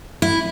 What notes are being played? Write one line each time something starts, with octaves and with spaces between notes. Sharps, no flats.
E4